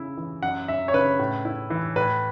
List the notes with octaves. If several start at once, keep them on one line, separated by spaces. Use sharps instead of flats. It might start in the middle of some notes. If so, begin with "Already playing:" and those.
Already playing: C#3 E4
E3
F#2 F#5
F#2 E5
C#5
C#3 B4
A2
E4
E3
A2 B4